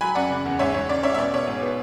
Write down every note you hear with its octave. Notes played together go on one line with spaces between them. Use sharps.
F#3 G#5 B5
F#2 D5 F#5
C#3
E2
G#2 C#5 E5
G#2 C#5
C#4 D5
C#4 C#5 E5
E5
B2 D5
B2 C#5
G#2
B3